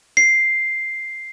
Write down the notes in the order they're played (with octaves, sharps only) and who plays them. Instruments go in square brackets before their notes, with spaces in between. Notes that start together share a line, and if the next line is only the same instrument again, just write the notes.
[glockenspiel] C7